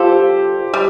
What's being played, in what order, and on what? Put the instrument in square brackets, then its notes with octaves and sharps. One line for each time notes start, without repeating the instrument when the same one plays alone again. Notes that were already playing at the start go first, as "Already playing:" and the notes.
Already playing: [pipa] G3 F4 A4 [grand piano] G4 C5
[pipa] G3